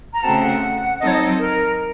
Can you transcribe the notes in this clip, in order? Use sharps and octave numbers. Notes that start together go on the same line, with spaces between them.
A#5
C#3 A3 C4 F#4 A5
F#5
F#3 C4 D#4 A4 D#5
C#5
D#5
A#4